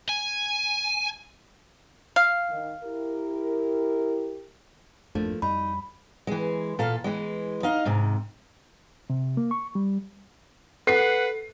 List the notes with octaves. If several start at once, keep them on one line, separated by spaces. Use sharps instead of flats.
G#5
F5
D#3
E4 G4 A#4
G#1 F2 F3 A3 A#3 D4
F2 G3 D#4 B5
E3 G#3
A#2 A4 F5
E3 G#3
D#4 D#5 F5
G#2 C3
C3
A#3
C#6
G3
A4 B4 F#5 C7